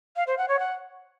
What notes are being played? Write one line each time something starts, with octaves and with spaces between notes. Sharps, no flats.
F5
C5
F#5
C#5
F#5